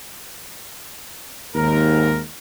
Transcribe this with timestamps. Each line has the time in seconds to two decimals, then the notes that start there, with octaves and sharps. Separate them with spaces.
1.55 D#2 G#2 A#4